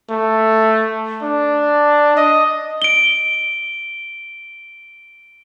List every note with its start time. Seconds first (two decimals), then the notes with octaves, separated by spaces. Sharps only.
0.10 A3
1.23 D4
2.17 D#5
2.82 D7 G7